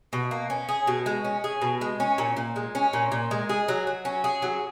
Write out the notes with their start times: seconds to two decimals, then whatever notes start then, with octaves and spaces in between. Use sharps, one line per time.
0.13 B2
0.31 A#3
0.50 C#4
0.69 G#4
0.87 B2
1.06 G#3
1.25 C#4
1.44 G#4
1.62 B2
1.81 G#3
2.00 C#4
2.18 A#2
2.37 A#2
2.56 G#3
2.75 C#4
2.93 A#2
3.12 A#2
3.31 G#3
3.49 G#4
3.68 F#3
3.87 F#3
4.05 C#4
4.24 G#4
4.42 F#3